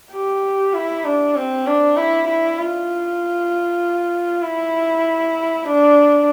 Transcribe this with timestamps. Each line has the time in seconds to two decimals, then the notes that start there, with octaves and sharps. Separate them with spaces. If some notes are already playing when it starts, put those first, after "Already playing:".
0.13 G4
0.74 E4
1.06 D4
1.36 C4
1.67 D4
1.97 E4
2.28 E4
2.59 F4
4.42 E4
5.66 D4